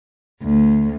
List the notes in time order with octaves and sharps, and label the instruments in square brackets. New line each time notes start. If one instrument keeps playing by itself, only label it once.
[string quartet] D2